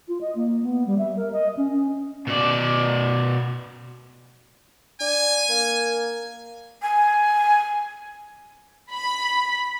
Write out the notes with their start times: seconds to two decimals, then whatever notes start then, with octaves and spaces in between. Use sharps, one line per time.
0.08 F4
0.21 D#5
0.35 A#3
0.63 B3
0.87 G3
0.98 E5
1.17 A#4
1.32 D#5
1.57 C#4
1.73 C#4
2.27 B2 D5
5.01 D4 G#5
5.49 A#3
6.82 G#5
8.92 B5